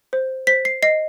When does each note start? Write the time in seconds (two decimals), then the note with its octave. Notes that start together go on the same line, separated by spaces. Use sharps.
0.13 C5
0.47 C5 B6
0.65 C7
0.82 D#5 C7